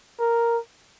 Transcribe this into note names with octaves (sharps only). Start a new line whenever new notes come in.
A#4